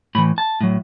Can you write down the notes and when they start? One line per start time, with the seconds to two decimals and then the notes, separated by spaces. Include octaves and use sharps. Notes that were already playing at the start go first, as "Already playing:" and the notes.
0.15 A2 B5
0.18 E3
0.38 A5
0.61 A2 F#3